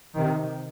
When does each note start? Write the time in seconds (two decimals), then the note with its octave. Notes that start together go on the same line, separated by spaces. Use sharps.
0.16 C3 D#3